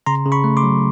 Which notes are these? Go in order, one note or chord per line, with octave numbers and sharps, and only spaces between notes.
C#3 A#5 C6
C#3
B5 C#6
A3
C6 D6
F#3